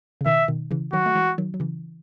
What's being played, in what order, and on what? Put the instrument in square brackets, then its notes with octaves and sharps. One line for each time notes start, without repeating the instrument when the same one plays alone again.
[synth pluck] C#3
[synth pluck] B2 D#3 [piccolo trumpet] E5
[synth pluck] B2 D#3
C#3 E3
[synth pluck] D#3 F#3 [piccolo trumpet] F#4
[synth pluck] A3
E3 G#3
D#3 F#3
F#3
C#3 E3